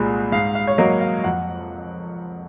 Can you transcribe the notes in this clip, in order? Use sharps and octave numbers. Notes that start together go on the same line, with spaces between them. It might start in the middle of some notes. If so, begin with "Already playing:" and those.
Already playing: C2 A#2 G#3 G#5
G#2 F5
F5
C#5
F#3 A#3 D#5
F5
F2 F#5